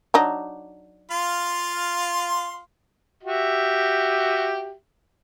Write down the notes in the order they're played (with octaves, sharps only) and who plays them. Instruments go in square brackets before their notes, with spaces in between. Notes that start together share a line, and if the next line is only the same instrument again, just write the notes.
[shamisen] F#3 D4 D#4
[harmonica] F4 F5 C6
F#4 G4 E5